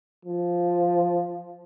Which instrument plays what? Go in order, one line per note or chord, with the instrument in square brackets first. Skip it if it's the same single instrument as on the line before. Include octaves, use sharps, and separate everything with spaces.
[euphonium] F3